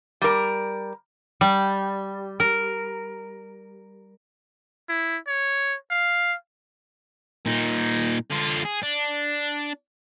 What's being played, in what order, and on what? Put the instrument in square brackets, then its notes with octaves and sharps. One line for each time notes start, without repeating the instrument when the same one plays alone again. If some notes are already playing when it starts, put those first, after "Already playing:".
[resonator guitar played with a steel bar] G3 A#4
[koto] G3
A#4
[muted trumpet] E4
C#5
F5
[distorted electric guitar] A#2 D#4
D3 F4
G#4
D4